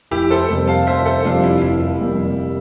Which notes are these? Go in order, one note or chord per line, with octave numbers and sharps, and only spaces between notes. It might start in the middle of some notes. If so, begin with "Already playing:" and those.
F1 E4 G4
A4 C5
F2 C3 G3 A#3
F5 A5
F1 C5 E5
A4 C5
F2 C3 G3 A#3 D4 F4
E4
F4
F1 E4
F2 C3 G3 A#3